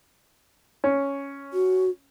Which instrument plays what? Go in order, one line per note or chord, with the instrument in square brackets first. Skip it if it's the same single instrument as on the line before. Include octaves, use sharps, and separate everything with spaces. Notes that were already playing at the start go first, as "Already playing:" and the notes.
[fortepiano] C#4
[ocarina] F#4